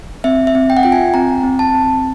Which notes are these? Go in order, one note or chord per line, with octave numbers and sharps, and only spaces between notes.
C4 E5
E5
C4
G5
F#5
F4 G5
G#5
C4 A#5
C4
A5
C4